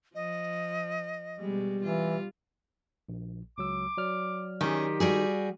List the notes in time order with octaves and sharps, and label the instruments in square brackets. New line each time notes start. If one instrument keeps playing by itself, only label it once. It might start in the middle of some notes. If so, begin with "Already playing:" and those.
[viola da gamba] F3 [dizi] D#5
[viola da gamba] B2 G#3 [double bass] G3
[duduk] E3 [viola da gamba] F4
[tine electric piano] A#1
[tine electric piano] C#2 F#3 E6 [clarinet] D6
[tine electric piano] F#3 D5 F6
[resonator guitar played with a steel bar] D#3 [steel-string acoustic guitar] C#4 G#4 [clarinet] G4
[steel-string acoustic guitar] G3 F#4 G#4